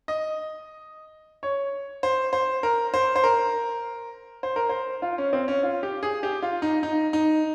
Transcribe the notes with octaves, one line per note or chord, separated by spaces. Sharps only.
D#5
C#5
C5
C5
A#4
C5
C5
A#4
C5
A#4
C5
F4
C#4
C4
C#4
F4
G4
G#4
G4
F4
D#4
D#4
D#4